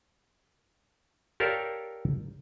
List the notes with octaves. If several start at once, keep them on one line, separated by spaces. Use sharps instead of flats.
G4 A4 A#4 C#5 D5 F5